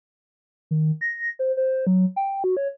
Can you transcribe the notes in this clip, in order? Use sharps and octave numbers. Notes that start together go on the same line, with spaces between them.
D#3
A#6
C5
C5
F#3
G5
F#4
C#5